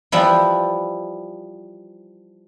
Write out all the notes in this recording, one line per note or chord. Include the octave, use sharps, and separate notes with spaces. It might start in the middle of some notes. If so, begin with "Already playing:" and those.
E3 F3 G3 E4